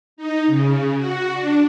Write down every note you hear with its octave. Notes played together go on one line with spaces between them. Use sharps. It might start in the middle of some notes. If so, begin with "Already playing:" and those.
D#4
C#3
F#4
D4